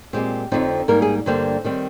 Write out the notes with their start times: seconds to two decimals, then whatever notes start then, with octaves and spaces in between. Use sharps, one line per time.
0.13 A#2 G#3 C4 G4
0.52 F2 D3 F3 C4 D#4
0.88 G#2 G3 A#3 A#4
1.02 G#4
1.26 G2 D3 G3 A#3 C5
1.64 D#3 G3 C4